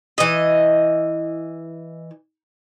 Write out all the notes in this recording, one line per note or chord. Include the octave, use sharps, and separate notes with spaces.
E3 D#5